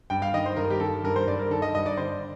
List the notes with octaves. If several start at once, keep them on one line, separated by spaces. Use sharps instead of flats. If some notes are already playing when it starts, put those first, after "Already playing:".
G2 G5
F5
D#3 D#5
C5
G2 A#4
G4
D#3 A4
G2 A#4
C5
G2 D5
A#4
D#3 A4
D#5
G2 D#5
D5
D3 C5